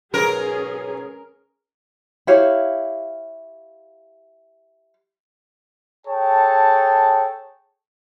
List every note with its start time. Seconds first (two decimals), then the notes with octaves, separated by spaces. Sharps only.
0.14 G#2 B2 F#3 C#4 G#4 A#4
2.27 E4 G4 C#5 F5
6.07 G#4 A4 C#5 G5 A5